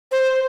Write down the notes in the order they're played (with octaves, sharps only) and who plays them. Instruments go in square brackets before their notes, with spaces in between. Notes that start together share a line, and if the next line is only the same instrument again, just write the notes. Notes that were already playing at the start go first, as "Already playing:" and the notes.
[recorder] C5